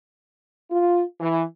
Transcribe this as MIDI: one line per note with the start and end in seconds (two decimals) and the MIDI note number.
0.70 1.03 65
1.20 1.42 52